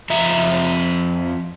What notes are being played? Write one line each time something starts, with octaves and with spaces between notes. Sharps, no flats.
F2 F3 E5 A#5